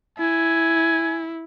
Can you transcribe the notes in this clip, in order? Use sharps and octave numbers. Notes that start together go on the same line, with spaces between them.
E4 G#5